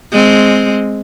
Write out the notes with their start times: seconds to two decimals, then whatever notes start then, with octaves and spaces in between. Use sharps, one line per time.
0.12 G#3 C4